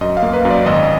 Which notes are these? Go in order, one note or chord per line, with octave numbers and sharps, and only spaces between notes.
F#2 D#5
F5
A#3
B4
F#2
D5
G#1 D#5